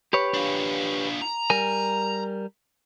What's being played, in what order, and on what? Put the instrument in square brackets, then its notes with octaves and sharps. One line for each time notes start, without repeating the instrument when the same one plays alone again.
[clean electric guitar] G4 B4 C#5
[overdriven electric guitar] D4 F4
A#5
[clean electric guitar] G3 A#4 G#5